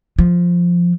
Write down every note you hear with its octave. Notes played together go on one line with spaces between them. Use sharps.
F3